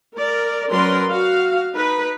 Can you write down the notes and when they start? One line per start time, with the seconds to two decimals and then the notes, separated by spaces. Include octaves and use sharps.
0.17 A#4 D5
0.71 F#3 C#4 A#4 B4 D5 C6
1.10 F#4 F5
1.74 D#4 B4